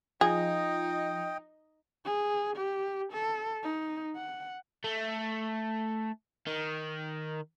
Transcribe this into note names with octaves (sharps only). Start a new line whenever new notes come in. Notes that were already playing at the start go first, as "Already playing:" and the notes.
F3 D#4 F4 G#4 D#5 G5
G#4
G4
A4
D#4
F#5
A3
D#3